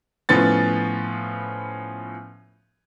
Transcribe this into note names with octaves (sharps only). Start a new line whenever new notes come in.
A2 F3 B3 C#4 A6